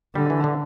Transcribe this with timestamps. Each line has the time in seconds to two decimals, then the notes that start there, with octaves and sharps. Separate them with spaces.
0.15 D3 G3
0.30 E3
0.44 D3